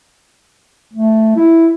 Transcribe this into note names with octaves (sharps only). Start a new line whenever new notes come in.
A3
E4